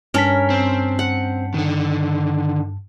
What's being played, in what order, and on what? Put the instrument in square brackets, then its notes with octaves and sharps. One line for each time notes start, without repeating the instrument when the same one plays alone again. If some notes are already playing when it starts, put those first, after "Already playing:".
[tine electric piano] G2 A5 B6 [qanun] C#4 A#4
[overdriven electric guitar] C4
[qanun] F#5
[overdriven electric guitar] D3 D#3